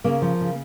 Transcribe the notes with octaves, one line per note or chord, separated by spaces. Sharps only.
C#3 A#3
F3
C#3